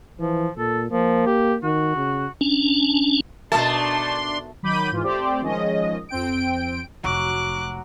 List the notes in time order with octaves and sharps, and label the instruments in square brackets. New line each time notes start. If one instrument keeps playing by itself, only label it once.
[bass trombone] E3 [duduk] F3
[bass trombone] A#2 [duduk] A4
[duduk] F3 [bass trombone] A#3
[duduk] G4
[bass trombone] D#3 [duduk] F#4
[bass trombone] C#3
[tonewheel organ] C#4 D4
[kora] B2 D#4 A#4 [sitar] A3 [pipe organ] D4 C6 [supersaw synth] A5
[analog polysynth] D#3 F#3 B5 D6 G6 D#7
G#2 E3 F4
A3 C4 G4 C5 D5
D#3 F3 G#3 C#4 D#5
F2 C4 G5 D7
[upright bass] F1 [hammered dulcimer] F#3 F#4 [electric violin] D6 F#6